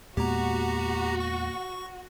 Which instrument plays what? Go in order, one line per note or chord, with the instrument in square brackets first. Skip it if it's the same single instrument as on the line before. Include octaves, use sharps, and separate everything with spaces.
[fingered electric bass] E2 G#3 B3 [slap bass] A#2 A#3 [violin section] F#4 [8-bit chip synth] G4 A#5
[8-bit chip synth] C#6